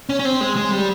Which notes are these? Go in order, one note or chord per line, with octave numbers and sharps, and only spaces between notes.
C#4
C#4
C4
G#3
G#3
G3